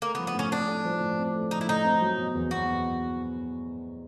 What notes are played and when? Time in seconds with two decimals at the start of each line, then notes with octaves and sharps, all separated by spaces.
0.02 A3 A#3
0.15 B3
0.19 F3
0.27 B3
0.34 A2 C#4
0.52 C4 D4
0.68 A3
0.85 F3
1.01 A2
1.18 C4
1.35 A3
1.51 F3 D#4
1.61 E4
1.67 A2 D#4
1.84 C4
2.01 F#3
2.18 B2
2.35 E2
2.51 B3 F#4